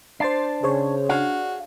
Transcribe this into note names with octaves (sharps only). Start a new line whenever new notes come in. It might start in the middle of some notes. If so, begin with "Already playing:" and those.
D4 C5 A6 C7
C#3 G#4 C5 C#5
D4 F#4 G#4 F5